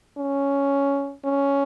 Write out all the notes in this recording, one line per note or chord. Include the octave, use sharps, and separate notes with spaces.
C#4
C#4